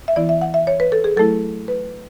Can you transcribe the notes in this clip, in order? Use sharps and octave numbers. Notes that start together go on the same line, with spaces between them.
E5
E3 B3 E4 D5
E5
F#5
E5
C#5
B4
A4
G#4
F#3 A3 E4 A4
B4